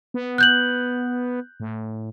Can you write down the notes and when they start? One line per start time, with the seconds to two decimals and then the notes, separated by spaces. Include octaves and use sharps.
0.14 B3
0.38 F#6 G6 F#7
1.60 A2